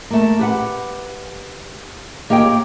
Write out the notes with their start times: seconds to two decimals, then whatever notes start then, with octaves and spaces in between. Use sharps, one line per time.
0.10 A3 A#3
0.39 G4 B4 F#5
2.30 A#3 G4 C#5 D#5 G5